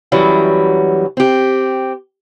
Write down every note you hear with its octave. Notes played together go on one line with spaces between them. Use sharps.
F#2 E3 F#3 G3
C4 G4